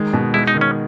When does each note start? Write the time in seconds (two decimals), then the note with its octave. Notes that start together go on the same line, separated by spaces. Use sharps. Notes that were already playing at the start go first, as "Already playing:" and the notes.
Already playing: D#3 G#3
0.13 B2
0.34 G#3 E4
0.48 D#4
0.55 D#3
0.61 C#4